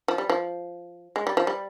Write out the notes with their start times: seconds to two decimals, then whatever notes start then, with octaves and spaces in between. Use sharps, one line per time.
0.08 F3
0.18 G3
0.30 F3
1.16 G#3
1.27 G3
1.37 F3
1.47 G3